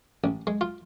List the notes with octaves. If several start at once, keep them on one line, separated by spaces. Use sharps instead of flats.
A1
G#3
F4